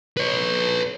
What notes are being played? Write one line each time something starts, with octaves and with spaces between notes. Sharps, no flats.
B4 C#5